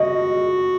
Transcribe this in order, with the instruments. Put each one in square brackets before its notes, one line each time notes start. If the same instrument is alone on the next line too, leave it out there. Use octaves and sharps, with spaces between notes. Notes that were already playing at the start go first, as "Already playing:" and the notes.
Already playing: [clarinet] F#4 [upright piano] D#5